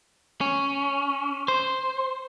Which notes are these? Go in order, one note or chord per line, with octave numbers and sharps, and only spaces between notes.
C#4
C5